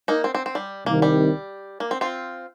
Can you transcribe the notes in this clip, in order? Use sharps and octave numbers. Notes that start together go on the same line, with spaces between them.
A#3 D#4
C4
C4
C4
G3
C2 C3 D#3 A#3
G3
A#3
C4
C4 F4